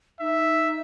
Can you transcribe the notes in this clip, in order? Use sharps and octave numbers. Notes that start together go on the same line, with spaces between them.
D#4 E5